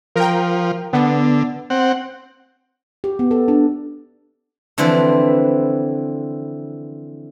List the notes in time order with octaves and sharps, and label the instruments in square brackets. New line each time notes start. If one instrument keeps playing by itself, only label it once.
[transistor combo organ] F3 [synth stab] A#4 G5
[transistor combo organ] D3 [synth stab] B3
[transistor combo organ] C4 F#5
[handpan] G4
B3
A4
D4
[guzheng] D3 E3 F3 C4 B4